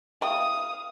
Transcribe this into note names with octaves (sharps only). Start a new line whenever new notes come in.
A3 E4 F5 G5 D#6